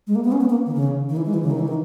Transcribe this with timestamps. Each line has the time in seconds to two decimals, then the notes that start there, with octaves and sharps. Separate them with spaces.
0.07 G#3
0.15 A#3
0.24 B3
0.32 C#4
0.41 B3
0.50 A#3
0.66 D#3
0.75 C#3
1.09 D#3
1.17 E3
1.26 G#3
1.34 E3
1.42 C#3
1.51 D#3
1.59 E3
1.68 D#3